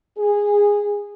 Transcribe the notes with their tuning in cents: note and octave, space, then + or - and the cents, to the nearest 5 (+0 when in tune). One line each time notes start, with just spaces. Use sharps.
G#4 -15